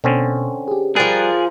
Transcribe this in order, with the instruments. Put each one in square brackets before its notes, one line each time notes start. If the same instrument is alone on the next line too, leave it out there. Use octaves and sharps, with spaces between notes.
[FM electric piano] B2 [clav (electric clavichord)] D3 C4 C#4
[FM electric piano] G4 G#4
[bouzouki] F3 A#4 [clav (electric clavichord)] G3 [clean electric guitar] G#4 [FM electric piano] F#6 A6